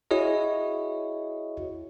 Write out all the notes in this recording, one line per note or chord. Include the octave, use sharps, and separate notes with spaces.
E4 F#4 G#4 C#5 D#5